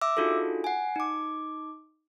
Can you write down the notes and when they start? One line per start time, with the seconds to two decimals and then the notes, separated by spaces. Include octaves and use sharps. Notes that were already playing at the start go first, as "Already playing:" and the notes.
0.01 E5 D6 E6
0.17 D4 D#4 F4 F#4 G#4 A4
0.64 F#5 G#5
0.96 D#4 D6